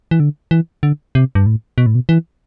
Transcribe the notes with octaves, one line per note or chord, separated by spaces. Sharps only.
E3
D3
E3
D3
C3
G2
A2
B2
A2
B2
E3